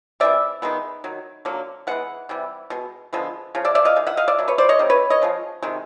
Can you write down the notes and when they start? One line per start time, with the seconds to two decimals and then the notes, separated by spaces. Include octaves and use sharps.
0.20 C3 E3 G#3 D5 E5
0.62 D#3 G#3 B3
1.04 D#3 F#3
1.45 D3 F#3 A#3
1.87 E3 G#3 B3 F#5
2.29 C3 E3 G3
2.70 B2 G#3
3.13 D3 F3 G#3 B3
3.55 C#3 F3
3.65 D5 E5
3.75 D5 E5
3.85 D#5 F5
3.96 D#3 G#3
4.07 E5 F#5
4.17 D#5 F5
4.28 D5 E5
4.38 B2 F#3
4.48 B4 C#5
4.58 C5 D5
4.69 C#5 D#5
4.79 C3 D#3 G3
4.90 B4 C#5
5.10 C#5 D#5
5.22 C#3 F3 G#3
5.62 C3 D#3 G#3